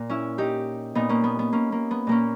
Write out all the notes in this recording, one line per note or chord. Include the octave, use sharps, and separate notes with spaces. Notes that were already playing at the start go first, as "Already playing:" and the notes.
Already playing: A#2
C#4 E4
D#4 G4
A#2 B3 D#4
A#3 C#4
B3
B3
A#3 C#4
A#3
B3
A#2 A#3 C#4